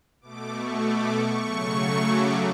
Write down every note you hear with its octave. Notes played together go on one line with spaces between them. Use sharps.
B2 A3 D6
C#6
D6
C#6
C#3 F#3 A3
D6